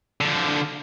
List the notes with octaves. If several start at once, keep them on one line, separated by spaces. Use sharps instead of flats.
D3 F3